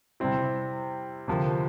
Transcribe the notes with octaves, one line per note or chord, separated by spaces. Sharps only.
C3 G3 C4 E4
D2 C3 F3 A#3